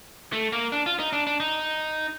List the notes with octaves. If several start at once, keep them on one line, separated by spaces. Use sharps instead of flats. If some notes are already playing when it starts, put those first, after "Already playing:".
A3
A#3
D4
F4
D#4
D4
D4
D#4